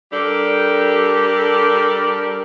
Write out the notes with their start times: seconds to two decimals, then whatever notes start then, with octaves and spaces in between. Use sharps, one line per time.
0.12 G3 D4 G4 A4 A#4